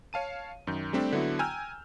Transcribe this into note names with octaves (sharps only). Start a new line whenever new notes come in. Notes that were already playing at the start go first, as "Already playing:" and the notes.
C#5 F5 A5 D#7
F#2 D#3 G6
G3 A3 C4 D4 G4
D3 F#3 B3 E4 F#4
G5 G#5 A#5 E6 F6 G6